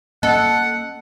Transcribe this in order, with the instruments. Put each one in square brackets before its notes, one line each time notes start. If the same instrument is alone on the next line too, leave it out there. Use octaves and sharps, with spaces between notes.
[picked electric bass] A#3 C#4 [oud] A4 [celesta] D#5 [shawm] F#5